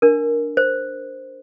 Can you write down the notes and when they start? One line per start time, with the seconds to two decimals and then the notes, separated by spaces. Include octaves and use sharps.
0.02 D4 A#4
0.57 C5